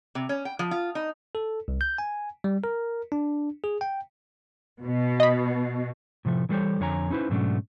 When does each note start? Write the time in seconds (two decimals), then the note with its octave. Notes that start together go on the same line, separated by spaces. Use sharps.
0.15 C3
0.29 C#4
0.45 G5
0.59 F3
0.71 F4
0.95 D#4
1.35 A4
1.68 C2
1.81 G6
1.98 G#5
2.44 G3
2.64 A#4
3.12 D4
3.64 G#4
3.81 G5
4.82 B2
5.20 D#5 B5
6.25 A2 C3 F3 A3
6.49 E3 F#3 G3 A4 C5 C#5
6.80 F2 D3 C#5 G#5 A#5
7.10 C#4 D#4 E4 G#4 B4 C5
7.30 G#2 B2 F#3 A3 C#4 D4